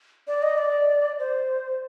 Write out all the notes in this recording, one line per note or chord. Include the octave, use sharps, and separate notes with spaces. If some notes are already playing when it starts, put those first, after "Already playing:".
D5
D#5
D5
C5